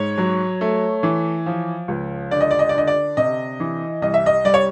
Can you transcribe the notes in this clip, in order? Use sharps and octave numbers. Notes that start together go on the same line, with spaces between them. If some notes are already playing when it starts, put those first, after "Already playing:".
Already playing: G#2 C#5
F#3
A3
E3
F3
C#2
D3 D5
D#5
D5
D#5
D5
D3 D#5
D5
C3 D#5
E3
C2 D#5
E5
D#5
G3 D5
C#5